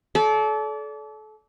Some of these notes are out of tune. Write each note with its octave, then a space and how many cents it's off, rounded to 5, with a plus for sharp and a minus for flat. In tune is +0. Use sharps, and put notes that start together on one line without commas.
A4 -30 D5 -30